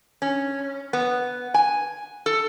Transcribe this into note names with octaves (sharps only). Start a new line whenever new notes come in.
C#4
B3
G#5
A4